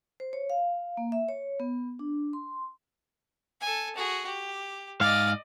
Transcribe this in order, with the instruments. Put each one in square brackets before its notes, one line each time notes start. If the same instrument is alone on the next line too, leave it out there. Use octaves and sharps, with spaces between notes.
[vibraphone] C5
C#5
F5
A#3
E5
C#5
B3
D4
C6
[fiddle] A4 G#5
F#4 G#4
G4
[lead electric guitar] G#2 F5 [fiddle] D5 D#5